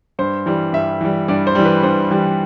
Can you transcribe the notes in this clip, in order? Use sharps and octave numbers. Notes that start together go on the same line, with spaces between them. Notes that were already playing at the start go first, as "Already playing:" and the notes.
G2 C5
E3 G3
G2 E5
E3 G3
G2 D5
C5
E3 G3
B4
G2 C5
E3 G3